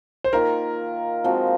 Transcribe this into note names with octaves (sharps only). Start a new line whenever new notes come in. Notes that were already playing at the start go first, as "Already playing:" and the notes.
C5
D#3 A#3 F4 A#4
F3 G#3 C4 F#4